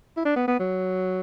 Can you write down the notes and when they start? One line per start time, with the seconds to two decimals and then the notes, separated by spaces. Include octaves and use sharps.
0.17 E4
0.25 D4
0.36 B3
0.48 B3
0.59 F#3